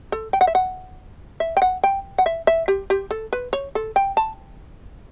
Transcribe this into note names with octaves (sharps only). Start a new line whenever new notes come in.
A4
G5
F#5
E5
F#5
E5
G5
F#5
G5
F#5
E5
E5
G4
G4
A4
B4
C#5
A4
G5
A5